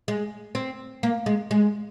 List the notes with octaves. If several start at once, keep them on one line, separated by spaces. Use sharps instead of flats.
G#3
C4
A#3
G#3
G#3